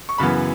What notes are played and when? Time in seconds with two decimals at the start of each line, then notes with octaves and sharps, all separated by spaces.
0.09 C#6
0.18 F#2 C#3 E3 B3 B5